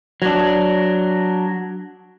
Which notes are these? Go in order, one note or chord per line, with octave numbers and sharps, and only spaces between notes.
F#3 D4